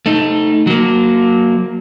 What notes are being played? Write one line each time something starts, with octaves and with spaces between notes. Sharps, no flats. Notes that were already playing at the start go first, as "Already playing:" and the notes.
A3 D#4
F#3 A#3